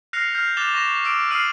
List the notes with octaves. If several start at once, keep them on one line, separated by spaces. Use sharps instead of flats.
F6 F#6 A#6 C7 C#7 F7
F6 G6 C7
D6 F#6 A6 E7 F7 G7
C#6 A#6 E7 F7
D6 E6 D7
D#6 F6 C7 D#7 F#7